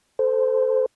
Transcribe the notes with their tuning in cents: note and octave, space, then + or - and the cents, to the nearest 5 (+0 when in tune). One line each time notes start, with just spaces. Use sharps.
A4 +0 C5 -15